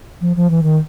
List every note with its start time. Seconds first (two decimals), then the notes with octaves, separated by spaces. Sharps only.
0.21 F3
0.36 F3
0.50 E3
0.63 D#3